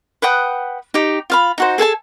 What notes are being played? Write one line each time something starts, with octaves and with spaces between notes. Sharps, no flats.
B4 F#5 G5 D#6
D#4 G4
F4 F5 B5
D#4 F#4 C5
G#4 A4 G#5 A5